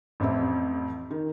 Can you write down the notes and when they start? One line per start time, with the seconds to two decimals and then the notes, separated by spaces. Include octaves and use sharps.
0.20 A1 F2 C4 E5
1.11 D#3